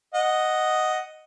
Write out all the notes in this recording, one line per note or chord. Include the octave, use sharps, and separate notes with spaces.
D#5 F#5